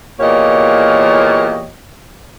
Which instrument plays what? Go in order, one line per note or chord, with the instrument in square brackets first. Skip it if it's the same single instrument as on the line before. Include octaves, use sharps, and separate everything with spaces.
[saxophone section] E2 A#2 A#3 G4 C#5 D#5